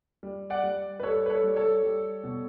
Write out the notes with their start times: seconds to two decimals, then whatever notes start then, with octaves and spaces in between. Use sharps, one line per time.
0.23 G3
0.50 D5 F#5
0.63 G3
1.00 B4
1.03 G3 A4 C#5
1.26 B4
1.30 A4 C#5
1.44 G3
1.56 A4 C#5
1.83 G3
2.23 B2